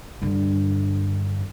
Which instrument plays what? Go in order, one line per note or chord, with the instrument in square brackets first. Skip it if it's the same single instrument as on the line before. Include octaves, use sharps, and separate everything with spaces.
[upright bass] G2 D3